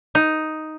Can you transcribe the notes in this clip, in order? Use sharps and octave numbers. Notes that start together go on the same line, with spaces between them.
D#4